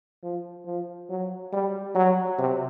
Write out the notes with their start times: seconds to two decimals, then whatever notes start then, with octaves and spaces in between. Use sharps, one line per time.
0.23 F3
0.66 F3
1.09 F#3
1.53 G3
1.95 F#3
2.38 C3